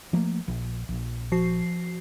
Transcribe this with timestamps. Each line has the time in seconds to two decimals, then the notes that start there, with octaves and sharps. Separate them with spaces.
0.13 F3 A3 A#3
0.48 A#1
0.89 A#1
1.32 F3 F#4 C7